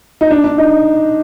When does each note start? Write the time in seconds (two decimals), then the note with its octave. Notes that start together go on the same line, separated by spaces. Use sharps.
0.21 D#4
0.31 D4
0.44 D4
0.58 D#4